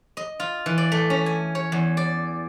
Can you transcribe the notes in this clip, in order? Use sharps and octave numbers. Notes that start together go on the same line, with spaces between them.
D#5
F4
E3
D5
A3
C#4
G#5
C#5
E2
D5